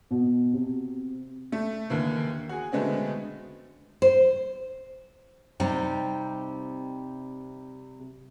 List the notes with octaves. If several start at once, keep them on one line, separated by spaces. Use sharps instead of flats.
B2
C3
A3
D#2 D3 E3 A#3
F#4 G#4
B2 D3 G#3 A3 B3 C4
C5
C3 G3 C4 D#4